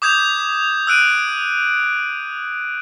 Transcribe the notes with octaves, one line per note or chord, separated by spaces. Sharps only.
D6 D#6 G6 G#6 F7
E6 F#6 D7 D#7